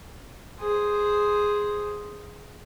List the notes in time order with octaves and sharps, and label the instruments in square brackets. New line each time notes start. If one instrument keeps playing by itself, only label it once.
[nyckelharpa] G#4 C5